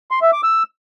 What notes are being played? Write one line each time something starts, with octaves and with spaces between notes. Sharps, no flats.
C6
E5
D6
E6